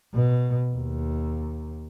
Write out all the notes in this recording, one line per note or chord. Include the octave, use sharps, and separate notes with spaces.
B2
D#2